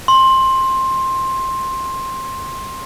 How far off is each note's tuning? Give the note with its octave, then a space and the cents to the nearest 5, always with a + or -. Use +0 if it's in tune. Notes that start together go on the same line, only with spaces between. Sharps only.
C6 +15